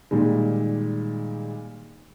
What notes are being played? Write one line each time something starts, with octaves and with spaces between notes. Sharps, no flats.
A#2 D#3 G3 G#3